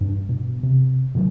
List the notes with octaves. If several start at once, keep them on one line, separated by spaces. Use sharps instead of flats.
G2 C#4 D4
B2
C3
B2 D#3 E3 F#3